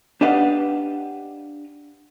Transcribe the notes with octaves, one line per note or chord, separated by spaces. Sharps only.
D4 G4 B4 D#5 F5 F#5